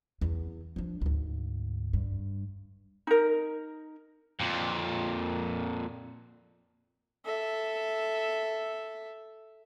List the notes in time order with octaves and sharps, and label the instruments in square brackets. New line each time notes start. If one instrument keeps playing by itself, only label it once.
[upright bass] E2
F3 D4
D2 G#2
G2
[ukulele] D#4 A#4
[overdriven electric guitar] F2 A#2
[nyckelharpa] A4 E5